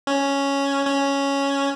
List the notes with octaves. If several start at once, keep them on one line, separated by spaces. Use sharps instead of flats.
C#4
C#4